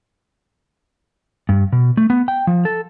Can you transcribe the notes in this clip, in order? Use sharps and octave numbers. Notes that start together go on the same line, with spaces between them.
G2
B2
A3
B3
G5
F3
A4